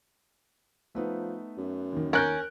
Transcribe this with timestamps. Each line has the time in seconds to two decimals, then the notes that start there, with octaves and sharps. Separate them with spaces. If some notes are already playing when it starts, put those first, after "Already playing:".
0.95 F3 A3 B3 D#4
1.58 F#2
1.92 D#2 D#3
2.13 C#4 A#4 F#6 G6